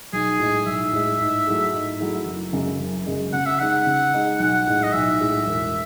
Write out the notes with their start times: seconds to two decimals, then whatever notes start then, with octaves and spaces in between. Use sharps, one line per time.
0.13 B1 G#4
0.40 A2 G#3
0.66 B1 E5
0.93 A2 G#3
1.20 G#2
1.47 F#3 A3 E4 G#4
1.73 G#2
2.00 F#3 A3 E4 G#4
2.26 F#1
2.53 F#2 C#3 G#3
2.80 F#1
3.06 F#2 C#3 G#3
3.33 C#3 F#5
3.46 E5
3.59 G#3 D#4 F#5
3.87 C#3
4.14 G#3 D#4
4.40 B1 F#5
4.67 A2 G#3
4.83 D#5
4.93 B1 E5
5.20 A2 G#3
5.47 E1